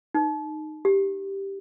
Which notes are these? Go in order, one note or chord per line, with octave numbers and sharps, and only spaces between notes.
D#4
G4